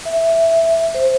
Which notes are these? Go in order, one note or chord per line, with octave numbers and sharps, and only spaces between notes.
E5
C5